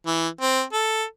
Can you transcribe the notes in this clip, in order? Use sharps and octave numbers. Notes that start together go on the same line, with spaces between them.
E3
C4
A4